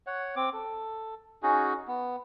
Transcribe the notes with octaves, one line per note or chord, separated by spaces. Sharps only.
C#5 F#5
C4 D6
A4
C#4 D#4 F#4 G#4
B3